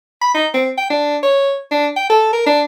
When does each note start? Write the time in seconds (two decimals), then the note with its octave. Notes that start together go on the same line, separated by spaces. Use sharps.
0.21 B5
0.34 D#4
0.54 C4
0.78 G5
0.90 D4
1.23 C#5
1.71 D4
1.96 G5
2.10 A4
2.33 A#4
2.46 D4